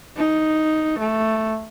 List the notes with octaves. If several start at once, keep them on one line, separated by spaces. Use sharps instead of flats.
D#4
A3